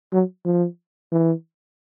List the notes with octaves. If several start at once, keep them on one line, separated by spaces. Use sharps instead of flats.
F#3
F3
E3